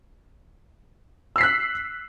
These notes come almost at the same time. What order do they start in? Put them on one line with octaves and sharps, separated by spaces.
E6 C7 B6 F#6